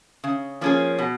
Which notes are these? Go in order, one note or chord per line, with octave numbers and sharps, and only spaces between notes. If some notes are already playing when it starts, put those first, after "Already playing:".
C#3
F3 A#3 C#4 G#4
B2